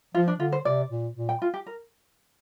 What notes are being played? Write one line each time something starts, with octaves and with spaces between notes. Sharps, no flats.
F3 F4
D4
D3 F4
C5
C3 D5
A#2
A#2
G5
F4
G4
A#4